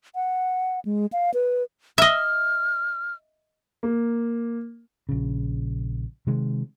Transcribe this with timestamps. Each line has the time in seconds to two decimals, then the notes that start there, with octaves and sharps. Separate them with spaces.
0.15 F#5
0.85 G#3
1.12 F5
1.34 B4
1.98 D#5 E5 F6
3.83 A#3
5.09 A#1 C#3
6.27 C3 D#3 G#3